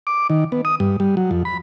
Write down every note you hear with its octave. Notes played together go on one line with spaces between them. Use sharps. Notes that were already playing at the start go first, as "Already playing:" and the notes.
D6
D#3
B3
D#6
G2
G3
F#3
F2
B5